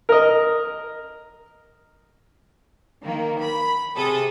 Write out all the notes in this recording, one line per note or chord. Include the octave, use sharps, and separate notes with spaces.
A#4 D#5
D#3 A#3
B5
C3 G#4 A4 D#6